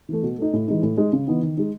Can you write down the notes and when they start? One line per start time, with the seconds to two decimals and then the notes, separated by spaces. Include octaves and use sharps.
0.09 E3 A3
0.23 B2
0.38 A3 D#4
0.53 A2
0.68 E3 G#3 D#4
0.83 A2
0.97 G#3 D#4
1.13 C#3
1.27 E3 B3 D#4
1.42 D#3
1.57 G#3 D#4